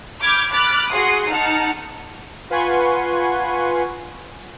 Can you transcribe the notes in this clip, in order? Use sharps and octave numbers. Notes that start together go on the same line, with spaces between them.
B5 D6 F6 G6 G#6
B5 D6 F6 F#6 A6
F#4 G#4 F#5 C6 D#6
D#4 F#5 A5 F6 C#7
F4 B4 F#5 G#5 C6 C#6